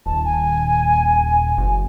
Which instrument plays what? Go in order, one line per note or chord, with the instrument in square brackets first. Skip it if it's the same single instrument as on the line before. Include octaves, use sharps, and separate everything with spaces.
[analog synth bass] D#1 [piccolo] A5
[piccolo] G#5
[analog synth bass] F#1